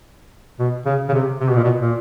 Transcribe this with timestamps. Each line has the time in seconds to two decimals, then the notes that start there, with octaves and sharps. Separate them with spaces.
0.59 B2
0.86 C#3
1.09 C#3
1.13 C3
1.40 C3
1.49 B2
1.56 A#2
1.64 B2
1.81 A#2